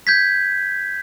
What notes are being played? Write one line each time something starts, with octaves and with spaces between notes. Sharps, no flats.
G6 G#6 B6